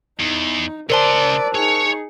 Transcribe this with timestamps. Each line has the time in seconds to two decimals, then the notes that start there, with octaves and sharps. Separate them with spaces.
0.20 E2 D#4
0.90 C#3 A#4 C5 D5 A5 C6
1.55 D#4 G#4 C#5